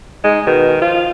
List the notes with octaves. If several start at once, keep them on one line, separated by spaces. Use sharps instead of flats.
G#3 D#4
B2 D#3
F3 F4